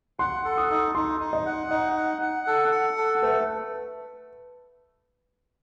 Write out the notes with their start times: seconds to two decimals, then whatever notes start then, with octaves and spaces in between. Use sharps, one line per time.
0.19 F#5 C6
0.45 A4
0.58 D#6
0.70 D#4
0.95 D#4 C6
1.20 D#4
1.33 D#5
1.46 F#5
1.70 D#4 D#5
1.96 F#5
2.22 F#5
2.47 A4
2.72 F#5
2.97 A4
3.22 A3 B4